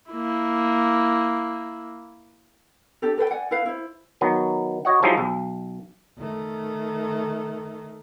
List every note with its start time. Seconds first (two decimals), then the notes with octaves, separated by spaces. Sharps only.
0.11 A#3 E4
3.02 D4 G4 A4
3.17 A4 B4 C5 G5
3.30 D5 F#5 G#5
3.51 E4 B4 F5
3.66 E4 C5
4.21 D#3 F#3 B3
4.85 F#4 C#5 D#5 F#5
5.03 F3 F#3 G#3 D#4 E4 G4
5.18 B1
6.18 D#3 A3